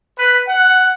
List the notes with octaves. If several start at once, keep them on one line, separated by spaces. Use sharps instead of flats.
B4
F#5